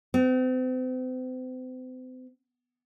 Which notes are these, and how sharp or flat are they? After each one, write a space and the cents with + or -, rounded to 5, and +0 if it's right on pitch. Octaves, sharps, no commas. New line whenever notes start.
C4 -40